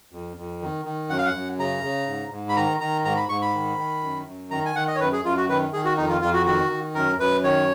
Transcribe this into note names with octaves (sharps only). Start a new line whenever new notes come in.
F2
F2
D#3
D#3
F#2 F#5
F5
F#5
F#2
C#3 A#5
C#3
G#2
G#2
B5
D#3 A#5
D#3 A#5
G#2 A#5
B5
G#2 C#6
B5
D#3
D#3
F#2
F#2
D#3 A#5
G#5
D#3 F#5
D#5
C#5
F#2 B4
G#4
F#2 F4
F#4
D#3 B4
D#3 G#4
F#4
F2 D#4
F4
F2 F4
F#4
D#3 F#4
D#3
F#2 A#4
F#2 B4
D#3 C#5